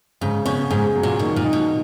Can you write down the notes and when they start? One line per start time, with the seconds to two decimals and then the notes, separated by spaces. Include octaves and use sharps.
0.21 G#2 C#3
0.46 B2 C#4
0.71 G#2 G#4
0.96 F#3
1.03 A#2
1.19 B2 D#3
1.36 A#2
1.45 D#4
1.53 B2